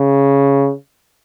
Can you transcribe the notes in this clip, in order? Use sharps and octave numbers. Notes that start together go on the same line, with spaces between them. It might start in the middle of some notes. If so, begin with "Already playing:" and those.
Already playing: C#3